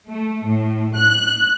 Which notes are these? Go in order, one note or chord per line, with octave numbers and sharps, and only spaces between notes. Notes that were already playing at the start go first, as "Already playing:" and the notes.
A3
A2
F#6